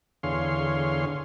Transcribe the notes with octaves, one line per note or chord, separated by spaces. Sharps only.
E2 D3 G#4 C#5 F5 C6